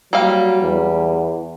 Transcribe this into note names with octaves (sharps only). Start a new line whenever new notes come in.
F#3 G3 A#3 F5
E2